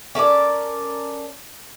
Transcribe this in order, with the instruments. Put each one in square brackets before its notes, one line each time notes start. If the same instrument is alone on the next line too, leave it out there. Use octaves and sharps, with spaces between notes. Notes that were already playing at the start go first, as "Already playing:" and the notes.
[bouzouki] C#4 A4 A#4 D5